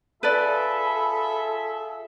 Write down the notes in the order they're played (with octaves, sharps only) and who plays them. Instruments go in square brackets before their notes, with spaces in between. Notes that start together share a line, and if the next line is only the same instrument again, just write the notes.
[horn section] F4 G#4 E5 [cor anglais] A4 [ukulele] B4 D5 [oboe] B5